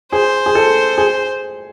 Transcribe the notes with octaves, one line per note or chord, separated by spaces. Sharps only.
G#4 C5
G#4
A4
G#4